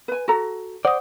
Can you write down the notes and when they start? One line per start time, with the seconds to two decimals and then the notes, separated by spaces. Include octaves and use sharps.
0.08 B4 G#5
0.28 F#4 A4 A#5
0.85 C5 D5 F#5 D#6